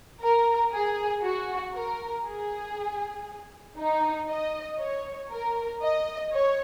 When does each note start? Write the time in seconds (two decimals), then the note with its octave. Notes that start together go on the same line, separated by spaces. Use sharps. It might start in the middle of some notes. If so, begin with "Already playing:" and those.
0.21 A#4
0.72 G#4
1.23 F#4
1.74 A#4
2.25 G#4
3.78 D#4
4.29 D#5
4.80 C#5
5.31 A#4
5.82 D#5
6.33 C#5